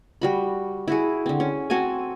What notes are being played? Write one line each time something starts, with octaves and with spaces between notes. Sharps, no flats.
G3 F#4 B5
E4 F#4 G#4
D3 C4
C#4
C4 F#4 A4 G#5